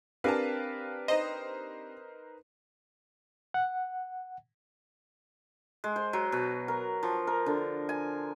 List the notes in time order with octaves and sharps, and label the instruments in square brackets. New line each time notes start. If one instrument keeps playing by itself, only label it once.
[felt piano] C4 D4 G4 [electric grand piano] A#4 B4 [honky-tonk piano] F5 G#5 A5
[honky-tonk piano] D#4 C5 [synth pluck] D#5
[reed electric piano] F#5
[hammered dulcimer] G#3
C5
F#3
B2
A#4
F3
A#4
D3
G#5